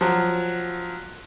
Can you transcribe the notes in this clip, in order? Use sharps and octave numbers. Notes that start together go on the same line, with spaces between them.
F3 F#3